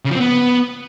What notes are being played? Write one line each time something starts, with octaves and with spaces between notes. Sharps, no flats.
C#3
F3
C4
B3